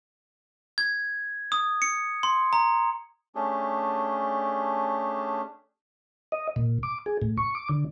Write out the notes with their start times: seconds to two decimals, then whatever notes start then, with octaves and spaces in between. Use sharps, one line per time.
0.78 G#6
1.52 D#6
1.82 C#7
2.23 C6
2.53 A#5
3.35 A3 C#4 D4 G4 G#4
6.32 D#5
6.56 A#2
6.83 D6
7.06 G#4
7.22 A2
7.38 C#6
7.55 D6
7.69 D3